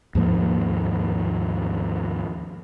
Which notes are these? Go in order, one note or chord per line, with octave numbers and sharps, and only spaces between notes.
D#2 G#2 F3 A#3